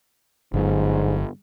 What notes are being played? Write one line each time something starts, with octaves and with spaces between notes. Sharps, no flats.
G1 G#2 D3 F#3